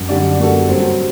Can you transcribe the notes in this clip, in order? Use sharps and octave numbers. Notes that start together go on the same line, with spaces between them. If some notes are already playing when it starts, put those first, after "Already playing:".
Already playing: F#2
D3 G3 D4 G4 D5
A#3 F#4 A4
G2 C3 F#3 C4